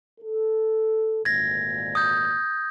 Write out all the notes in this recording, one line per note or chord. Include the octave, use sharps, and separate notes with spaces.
A4
G#1 D2 A#2 G#6 A#6
D#6 G6